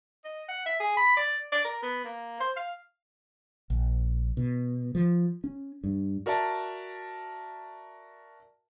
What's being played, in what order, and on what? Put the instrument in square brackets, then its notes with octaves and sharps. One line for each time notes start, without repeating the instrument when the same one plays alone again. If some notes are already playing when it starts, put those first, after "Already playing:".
[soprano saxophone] D#5
F#5
E5
G#4
B5
D5
D5
A#4
B3
A#3
C5
F5
[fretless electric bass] A#1
B2
F3
C#4
G2
[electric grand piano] F#4 A#4 D5 E5 A5